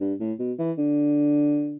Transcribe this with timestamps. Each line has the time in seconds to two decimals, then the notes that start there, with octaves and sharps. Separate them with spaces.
0.01 G2
0.20 A2
0.39 B2
0.59 E3
0.78 D3